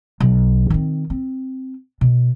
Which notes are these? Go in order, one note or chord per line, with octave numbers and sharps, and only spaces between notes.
B1
D#3 C4
C4
B2